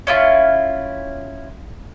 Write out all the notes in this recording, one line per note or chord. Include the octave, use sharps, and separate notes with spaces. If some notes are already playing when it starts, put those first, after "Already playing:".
C#4 E4 F4